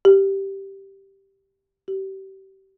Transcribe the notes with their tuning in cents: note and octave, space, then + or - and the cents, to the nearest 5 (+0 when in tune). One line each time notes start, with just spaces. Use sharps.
G4 -5
G4 -30